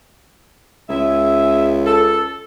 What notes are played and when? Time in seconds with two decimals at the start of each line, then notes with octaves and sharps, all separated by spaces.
0.89 C#2 G#4 E5
1.86 A4